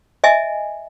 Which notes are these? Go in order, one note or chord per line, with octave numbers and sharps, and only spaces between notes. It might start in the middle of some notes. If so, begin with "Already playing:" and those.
D#5 E5 G#5